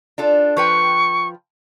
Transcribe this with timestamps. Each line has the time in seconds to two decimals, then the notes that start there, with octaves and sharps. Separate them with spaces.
0.18 D4 F4 A4
0.57 F3 B4 G5 C#6